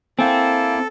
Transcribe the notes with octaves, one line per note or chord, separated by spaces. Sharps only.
A#3 C4 E4 A4 F5 G5 G#5